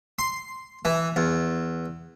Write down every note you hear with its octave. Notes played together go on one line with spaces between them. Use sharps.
C6
E3
E2